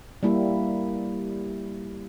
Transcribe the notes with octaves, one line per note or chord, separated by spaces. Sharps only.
G3 A#3 E4 G4